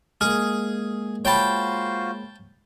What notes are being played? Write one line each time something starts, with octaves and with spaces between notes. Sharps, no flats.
G#3 A#3 G#4 F6
F4 F#4 C5 C#5 G5 A5 B5